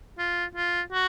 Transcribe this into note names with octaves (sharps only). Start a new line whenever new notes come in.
F4
F4
F#4